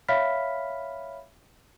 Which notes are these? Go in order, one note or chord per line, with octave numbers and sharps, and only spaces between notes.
C#5 E5 F5 B5 F6 B6